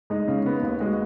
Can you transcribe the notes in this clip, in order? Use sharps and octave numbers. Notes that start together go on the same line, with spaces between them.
G#3 D#4
C#3
B3
D#2
G#3 F#4